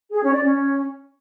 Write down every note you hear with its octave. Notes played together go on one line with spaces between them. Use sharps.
G#4
C#4
D5
C#4